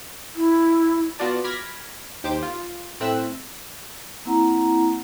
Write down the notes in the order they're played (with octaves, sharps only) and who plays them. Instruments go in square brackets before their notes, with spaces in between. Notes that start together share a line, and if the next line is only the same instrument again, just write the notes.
[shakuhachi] E4
[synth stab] B3 F4 F#4 D5 A5
B5 D6 F6 G#6 A#6 B6
D#2 G4 C5 D6
F4
A2 C4 E5 E6 F#6
[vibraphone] A#3 C4 E4 F#5 A#5